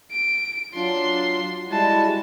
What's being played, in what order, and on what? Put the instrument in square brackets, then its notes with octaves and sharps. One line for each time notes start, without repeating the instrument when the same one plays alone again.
[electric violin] D7
[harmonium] F#3 F4 [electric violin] D4 C6
[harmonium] G3 G#3 E4 [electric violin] F#4 A5